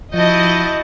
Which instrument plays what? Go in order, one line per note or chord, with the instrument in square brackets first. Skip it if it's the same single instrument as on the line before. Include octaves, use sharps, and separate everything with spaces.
[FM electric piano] F3 [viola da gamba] E4 F#4 [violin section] D#5 [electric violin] A5 G6